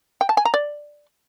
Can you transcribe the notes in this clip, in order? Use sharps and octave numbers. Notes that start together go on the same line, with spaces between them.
G5
A5
G#5
A#5
D5